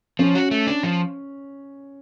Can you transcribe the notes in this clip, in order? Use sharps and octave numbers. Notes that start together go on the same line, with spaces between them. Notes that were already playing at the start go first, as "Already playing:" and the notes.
F3 C#4
F#4
A3
D4
F3